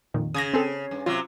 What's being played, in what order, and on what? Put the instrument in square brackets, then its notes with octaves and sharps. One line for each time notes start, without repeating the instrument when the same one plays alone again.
[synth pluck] F2 A#2 D#3
[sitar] C#3 [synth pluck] D#6 G#6 A#6
[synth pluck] C4 G#4 A4
[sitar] G2
[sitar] C3 F#3 [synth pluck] F4